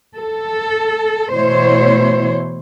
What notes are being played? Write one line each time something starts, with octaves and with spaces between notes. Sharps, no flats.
A4
B2 E3 A3 E4 C5 C#5